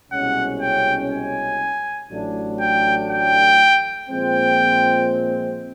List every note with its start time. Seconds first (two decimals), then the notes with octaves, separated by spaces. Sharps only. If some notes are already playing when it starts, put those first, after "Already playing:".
0.12 C2 B2 G#3 C#4 F#5
0.62 G5
1.11 G#5
2.11 A1 A2 F#3 A3 D4
2.60 G5
3.11 G5
4.09 A#2 F3 G#3 C4 G5